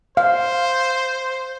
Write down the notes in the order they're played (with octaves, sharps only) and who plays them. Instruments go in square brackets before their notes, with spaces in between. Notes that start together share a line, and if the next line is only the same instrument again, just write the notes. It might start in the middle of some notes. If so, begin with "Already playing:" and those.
[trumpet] C5 [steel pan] F5